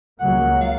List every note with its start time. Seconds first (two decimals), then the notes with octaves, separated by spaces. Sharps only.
0.19 C#2 C#3 F#3 A#3 F#5
0.61 F5